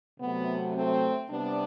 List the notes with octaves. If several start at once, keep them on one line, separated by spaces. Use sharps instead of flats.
C3 F#3 A3 B3
A3 C4
C3 G3 B3 D4